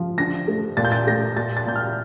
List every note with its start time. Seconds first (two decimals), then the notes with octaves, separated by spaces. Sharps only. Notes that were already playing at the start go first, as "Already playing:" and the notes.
Already playing: F3
0.18 D3 A#6
0.48 A3
0.77 A#2 A6
0.85 G6
0.92 A6
1.07 A3 A#6
1.37 A#2 A6
1.57 A6
1.66 A#2 G6
1.76 F6